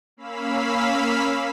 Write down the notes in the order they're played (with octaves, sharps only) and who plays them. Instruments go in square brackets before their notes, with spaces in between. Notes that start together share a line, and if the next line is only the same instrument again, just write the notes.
[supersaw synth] A#3 C#4 F5 B5 E6 B6